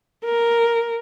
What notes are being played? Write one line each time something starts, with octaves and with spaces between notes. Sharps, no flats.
A#4